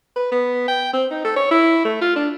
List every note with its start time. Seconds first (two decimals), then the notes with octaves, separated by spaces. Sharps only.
0.16 B4
0.32 B3
0.68 G5
0.93 C4
1.11 D#4
1.25 A4
1.36 C#5
1.51 E4
1.85 A3
2.02 F4
2.16 D4